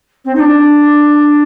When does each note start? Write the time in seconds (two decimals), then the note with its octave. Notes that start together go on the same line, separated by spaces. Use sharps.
0.25 C4
0.35 D#4
0.39 D4